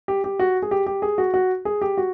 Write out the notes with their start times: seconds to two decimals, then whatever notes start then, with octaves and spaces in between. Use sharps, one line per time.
0.08 G4
0.24 G4
0.39 F#4
0.62 G#4
0.71 G4
0.86 G4
1.02 G#4
1.18 F#4
1.34 F#4
1.65 G#4
1.81 G4
1.97 F#4